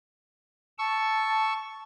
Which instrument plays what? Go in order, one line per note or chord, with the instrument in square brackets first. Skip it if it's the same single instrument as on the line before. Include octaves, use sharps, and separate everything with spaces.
[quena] A5 [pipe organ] C#6 E6